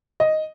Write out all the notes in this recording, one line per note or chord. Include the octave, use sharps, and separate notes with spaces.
D#5